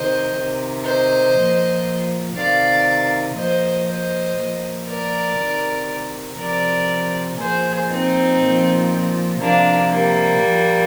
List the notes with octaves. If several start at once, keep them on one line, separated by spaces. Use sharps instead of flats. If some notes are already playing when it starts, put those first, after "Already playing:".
Already playing: C3 D#3 C5 D#5
C3 D#3
C5 D#5
A#2 F3
C3 D#3 D5 F5
A#2 F3 C5 D#5
C5 D#5
A#2 F3
A#4 D5
C3 D#3
C3 F3 A#4 D5
A#2 F3 G#4 C5
C4 D#4
A#2 F3
C3 F3 A#3 D4
G3 A#3
A#2 F3